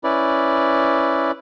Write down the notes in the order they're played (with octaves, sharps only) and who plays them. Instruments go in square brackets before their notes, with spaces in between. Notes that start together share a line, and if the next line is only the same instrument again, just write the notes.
[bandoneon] C#4 E4 B4 D5